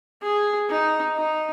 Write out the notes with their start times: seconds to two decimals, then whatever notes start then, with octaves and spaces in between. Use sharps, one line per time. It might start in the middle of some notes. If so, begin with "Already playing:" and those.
0.22 G#4
0.69 D#4
1.17 D#4